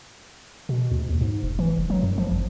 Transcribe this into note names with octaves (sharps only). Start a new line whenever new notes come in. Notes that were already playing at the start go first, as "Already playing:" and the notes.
B2
D2
D#2
G#2
F1
E3
F1
F#3
F#2
F3
G#1